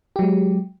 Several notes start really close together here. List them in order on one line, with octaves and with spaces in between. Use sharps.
G4 F#3 G#3